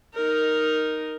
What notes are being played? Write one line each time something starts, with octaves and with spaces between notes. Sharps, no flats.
D#4 A#4